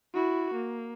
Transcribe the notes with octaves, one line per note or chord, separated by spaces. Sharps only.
E4 F#4
A#3